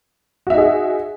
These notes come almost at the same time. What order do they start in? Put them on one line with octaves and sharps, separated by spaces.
F#4 E5 D#4 G#4